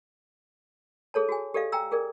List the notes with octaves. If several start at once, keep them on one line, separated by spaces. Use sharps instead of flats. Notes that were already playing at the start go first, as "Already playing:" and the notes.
G#4 A4 C#5 A5
F#4 G#4 G#5
G4 A4 D5 D#5 F5
G5 G#5 A#5 E6
G#4 A#4 D5